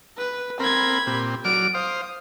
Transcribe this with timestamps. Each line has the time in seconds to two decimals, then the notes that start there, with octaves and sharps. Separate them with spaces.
0.17 B4
0.60 C4 A#4 B5 G#6
1.07 A#2 C4 G4
1.45 F#3 D5 F6 D7
1.75 C5 F5 D#6